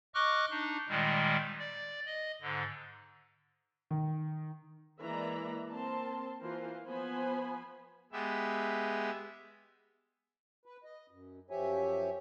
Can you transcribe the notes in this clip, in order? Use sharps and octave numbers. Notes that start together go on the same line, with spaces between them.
D#5 C#6 D6 F6 F#6
D4 D#4
A#2 D#3 G3 G#3
D5
D#5
G#2 D3
D#3
E3 G#3 A#3 D5 E5 A#5
A#3 C4 A#4 A5 C6
E3 A#3 F4 A#4 C5
F3 B3 C5 G#5 B5
G#3 B3 G4 E5
B4
D#5
F#2
F#2 F3 G4 C#5 E5 G#5